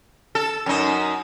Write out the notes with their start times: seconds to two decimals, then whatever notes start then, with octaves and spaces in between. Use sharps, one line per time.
0.35 A4
0.66 F#2 D#4